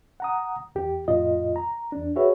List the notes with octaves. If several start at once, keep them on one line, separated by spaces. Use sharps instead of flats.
F#5 A#5 D#6
E2 G4
F2 A2 F4 D#5
A#5
E2 D4
F#4 G#4 B4 C#5 E5